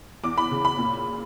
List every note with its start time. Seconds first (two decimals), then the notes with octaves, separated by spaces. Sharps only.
0.23 E2 D6
0.37 B5
0.51 C#3
0.65 B5
0.79 A#2